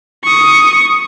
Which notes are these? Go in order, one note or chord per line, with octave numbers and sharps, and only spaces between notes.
C#6 D#6